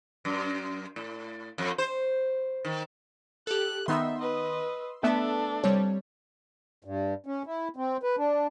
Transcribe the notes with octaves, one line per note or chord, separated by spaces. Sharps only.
F#2
A2
F2
C5
D#3
G4 A4 F#6
D#3 B3 D#4 E5 C6 E6
B4 D#5
A3 B3 D4 A4 E5
C3 G3 C#5
G2
C#4
E4
C4
B4
D4